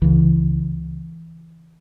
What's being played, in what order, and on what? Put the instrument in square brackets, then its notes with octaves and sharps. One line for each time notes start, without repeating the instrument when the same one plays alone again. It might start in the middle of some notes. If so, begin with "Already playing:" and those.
[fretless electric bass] C#2 C#3 E3